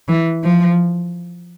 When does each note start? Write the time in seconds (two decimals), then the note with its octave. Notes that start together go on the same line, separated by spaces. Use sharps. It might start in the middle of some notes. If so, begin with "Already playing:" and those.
0.08 E3
0.44 F3